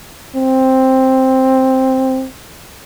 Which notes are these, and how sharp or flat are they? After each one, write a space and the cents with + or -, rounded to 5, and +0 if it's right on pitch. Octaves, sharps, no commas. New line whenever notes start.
C4 +5